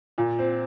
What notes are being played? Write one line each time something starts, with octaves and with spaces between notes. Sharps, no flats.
A#2
C4